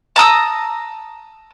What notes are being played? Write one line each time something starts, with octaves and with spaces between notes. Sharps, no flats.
A5 A#5 D#6 E6